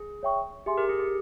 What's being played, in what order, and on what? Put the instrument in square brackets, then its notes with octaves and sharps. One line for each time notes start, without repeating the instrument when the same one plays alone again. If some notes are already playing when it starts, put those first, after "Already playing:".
Already playing: [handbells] G#4
[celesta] C#5 E5 G5 C#6
[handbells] G4 [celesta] G#4 E5 G#5 C6
[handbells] G4 A#4
G#4
G4